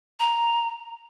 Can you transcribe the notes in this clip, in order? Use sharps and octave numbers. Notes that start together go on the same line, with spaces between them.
A#5